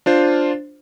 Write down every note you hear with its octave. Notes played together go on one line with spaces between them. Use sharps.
D4 F4 C5